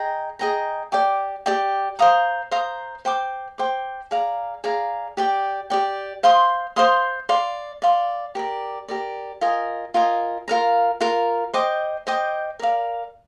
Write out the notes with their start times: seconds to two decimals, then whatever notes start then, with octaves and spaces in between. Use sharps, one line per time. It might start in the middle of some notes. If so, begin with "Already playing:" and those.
Already playing: G#4 D#5 G5 A#5
0.39 G#4 D#5 G5 A#5
0.92 G4 D5 G5 D6
1.46 G4 D5 G5 D6
1.99 C5 F5 A#5 D#6
2.51 C5 F5 A#5 D#6
3.05 C5 G5 D6
3.58 C5 G5 D6
4.11 G#4 D5 F5 A#5
4.64 G#4 D5 F5 A#5
5.17 G4 D5 G5
5.70 G4 D5 G5
6.23 C5 F5 C6 D#6
6.76 C5 F5 C6 D#6
7.29 D5 F5 C6
7.82 D5 F5 C6
8.35 G4 A#4 D5
8.88 G4 A#4 D5
9.41 F4 A#4 D#5 G#5
9.94 F4 A#4 D#5 G#5
10.48 F4 A#4 F5 A#5
11.01 F4 A#4 F5 A#5
11.54 C5 D#5 G5 D6
12.07 C5 D#5 G5 D6
12.59 A#4 D5 F5